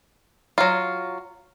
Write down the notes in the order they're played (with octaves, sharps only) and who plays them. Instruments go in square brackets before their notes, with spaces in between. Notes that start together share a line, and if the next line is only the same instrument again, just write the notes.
[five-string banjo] F#3 F4